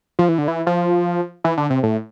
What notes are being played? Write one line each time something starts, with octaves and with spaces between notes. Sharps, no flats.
F3
E3
D3
E3
F3
E3
D3
C3
A2